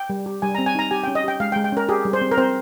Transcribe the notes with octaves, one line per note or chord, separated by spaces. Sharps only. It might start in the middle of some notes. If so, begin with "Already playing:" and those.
Already playing: G5
G3
G4
G3 G#5
A#5
C4
G#5
D#4 A#5
G4 G#5
G5
C#4
D#5
G4 G5
G#3 F5
G5
G#3
G5
C#4 A#4
G4 G#4
G3
C5
C4
A#4
C4 C5